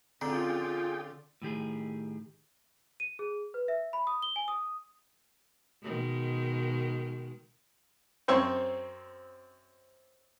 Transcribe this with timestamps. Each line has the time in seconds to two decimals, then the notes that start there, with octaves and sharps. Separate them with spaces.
0.21 D3 C4 C#4 F4 G#4 G5
1.42 A2 D#3 G4 G#4
3.00 D#7
3.19 G#4
3.54 B4
3.68 E5
3.93 B5
4.07 D#6
4.22 G7
4.36 G#5
4.48 D#6
5.83 B2 D#3 G#3
8.28 F#2 C4 C5 C#5 C#6 E6